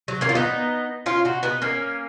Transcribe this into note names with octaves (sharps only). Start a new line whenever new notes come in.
F#3
A#3 C#4
F4
B3 D#4
C#4 F4
D#4 F#4
B3 D#4
A#3 C#4